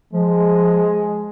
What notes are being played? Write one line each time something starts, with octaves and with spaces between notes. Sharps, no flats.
F3 G#3